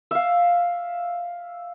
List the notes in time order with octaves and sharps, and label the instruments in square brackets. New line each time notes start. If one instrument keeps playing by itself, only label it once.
[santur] E5 F5